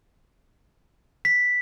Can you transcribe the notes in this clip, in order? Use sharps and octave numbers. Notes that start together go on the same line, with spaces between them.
B6